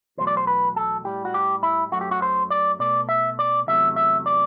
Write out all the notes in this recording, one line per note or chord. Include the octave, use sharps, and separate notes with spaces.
E2 B2 F#3 A3 C5
D5
C5
B4
A4
A2 G3 G4
F#4
G4
E4
F#2 F#3 A3 F#4
G4
F#4
C5
D5
B2 A3 D5
E5
D5
E2 C3 F#3 A3 E5
E5
D5